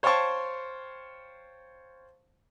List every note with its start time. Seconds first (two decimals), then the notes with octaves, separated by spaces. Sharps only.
0.03 C5 C#5 F5 G5 A5 C#6